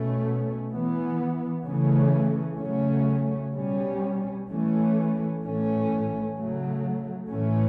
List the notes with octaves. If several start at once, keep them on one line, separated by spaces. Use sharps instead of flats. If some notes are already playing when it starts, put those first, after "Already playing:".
Already playing: B2 A3 C#4
E3 B3
C#3 E3 A3 C#4
C#3 F#3 A3 C#4
B2 G3 C#4
E3 A3 C#4
A2 E3 A3 C#4
C#3 F#3 A3
A2 E3 A3 C#4